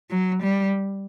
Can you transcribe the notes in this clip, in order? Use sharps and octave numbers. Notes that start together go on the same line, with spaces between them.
F#3
G3